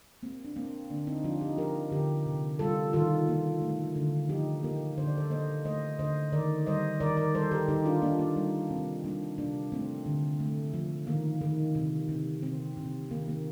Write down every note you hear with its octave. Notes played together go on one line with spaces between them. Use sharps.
A#3 C4
D4
A#3 C4
D3 A#3 D4
C4 D#4
F3 D4 F4
D#4 G4
F3 G4 A#4
D3 G4 A#4
C3
G3 F4 A4
D#3 F4 A4
A#3
A3
D3
F3 D#4 G4
A#3 G4 A#4
D3 C5
D5
A4 C5
A#3 C5 D#5
A3 C5 D#5
D3 C5 D#5
D#3 A#4 D5
G3 C5 D#5
D#3 A#4 D5
A#4 D5
G3 A4 C5
G4 A#4
D#3 D#4 G4
D4 F4
A#3 D4
A#3
G3
C3 C4
G3 A#3 D4
C3 A#3 D4
A3 C4
D3
A3
F3
D#3 A#3
D#3
C3
C3
C3 C4
C3
D#3 A#3
A#3